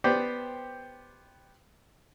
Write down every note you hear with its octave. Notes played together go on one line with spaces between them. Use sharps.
B3 G4 C5 D5